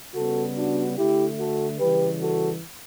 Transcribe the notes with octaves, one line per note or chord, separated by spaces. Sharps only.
C#3 G3 B3 F#4 A4
D4 F#4
D3 A3 E4 G4
F#4 A4
C#3 E3 G3 G4 B4
F#4 A4